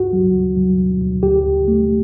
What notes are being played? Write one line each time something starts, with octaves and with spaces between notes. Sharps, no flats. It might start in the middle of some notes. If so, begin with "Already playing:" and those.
Already playing: D2 G2 F#4
F#3
D2
F#3
D2
D2
D2 G4
D2
A3